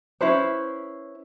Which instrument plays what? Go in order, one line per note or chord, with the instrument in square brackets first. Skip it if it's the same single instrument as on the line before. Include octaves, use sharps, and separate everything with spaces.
[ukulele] C#4 E4 B4 C5